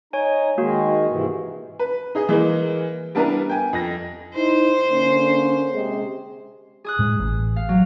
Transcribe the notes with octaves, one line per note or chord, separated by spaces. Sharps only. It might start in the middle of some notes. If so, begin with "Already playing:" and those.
D#4 C#5 G#5
D#3 G#3 A#3 F#4
G#2 C3 E3
B4
D#4 G#4 D#5
E3 G#3 A#3
G3 B3 D4 E4 A#4 B4
G5 G#5
F2 A#6
D#4 E4 C5
D3 A#3 C#4
C3 G#3
G#4 D#6 F#6
A2 G#3
A1
F5
F#3